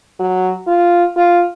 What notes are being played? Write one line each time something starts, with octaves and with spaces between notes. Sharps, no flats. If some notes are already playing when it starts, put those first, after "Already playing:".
F#3
F4
F4